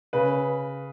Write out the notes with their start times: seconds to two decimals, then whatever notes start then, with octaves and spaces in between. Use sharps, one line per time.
0.13 C#3 B4